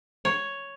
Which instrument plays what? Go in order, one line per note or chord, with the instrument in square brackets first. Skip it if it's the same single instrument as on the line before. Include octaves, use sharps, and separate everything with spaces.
[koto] C#5